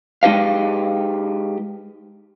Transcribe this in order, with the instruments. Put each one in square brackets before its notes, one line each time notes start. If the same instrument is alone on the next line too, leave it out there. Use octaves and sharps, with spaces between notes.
[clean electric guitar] G#3 D#4 G4 B4 F5